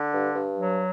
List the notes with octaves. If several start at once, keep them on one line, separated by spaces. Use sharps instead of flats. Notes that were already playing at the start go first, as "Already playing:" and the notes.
Already playing: D3
G2
G2
F#3